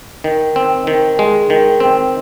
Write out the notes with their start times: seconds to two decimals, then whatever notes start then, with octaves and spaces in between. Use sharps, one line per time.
0.24 D#3
0.56 C4
0.87 D#3
1.19 G#3
1.50 D#3
1.80 C4